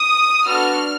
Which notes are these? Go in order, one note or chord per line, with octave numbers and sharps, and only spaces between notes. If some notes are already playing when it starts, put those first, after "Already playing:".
Already playing: D#6
B3 D4 F#4 A4 F6